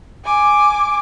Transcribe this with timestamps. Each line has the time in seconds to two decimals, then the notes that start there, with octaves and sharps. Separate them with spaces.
0.25 G#5 D6